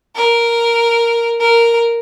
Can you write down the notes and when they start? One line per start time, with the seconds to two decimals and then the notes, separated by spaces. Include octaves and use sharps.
0.16 A#4
1.40 A#4